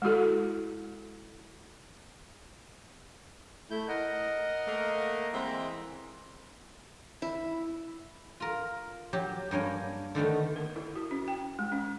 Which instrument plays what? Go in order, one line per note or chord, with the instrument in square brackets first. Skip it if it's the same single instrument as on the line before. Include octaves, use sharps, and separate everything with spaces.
[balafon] G#3 E4 F#4 A4
[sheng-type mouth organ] A3 E4 G6
A#4 D#5 F#5
[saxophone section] A3 A#3
[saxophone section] E3 G#3 C4 [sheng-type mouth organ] E5 A#5
[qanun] E4
[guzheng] F4 A#4
F#3 G4
G2 A#3 C#4 G#5
D3 D#3 A3 B3
[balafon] A#4
E4
F#4
C#4
G5
G#3
C#4